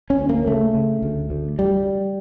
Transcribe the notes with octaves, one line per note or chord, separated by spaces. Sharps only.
C#4
D2
A#3
C#3 A3
C#3
D2
D2
G3